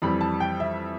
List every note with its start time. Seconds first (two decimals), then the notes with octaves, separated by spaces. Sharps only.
0.02 F2 E3 G3 B5
0.21 A5
0.40 G5
0.60 E5